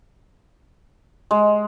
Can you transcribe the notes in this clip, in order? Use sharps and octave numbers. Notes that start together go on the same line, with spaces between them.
G#3